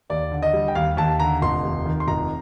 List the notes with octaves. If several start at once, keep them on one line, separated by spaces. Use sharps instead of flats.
D#2 D5
D3
D#5
G3
G5
D#2 F5
D#2 A5
D3 A#5
F1 C6
D#2
D#3
C6
F1 A#5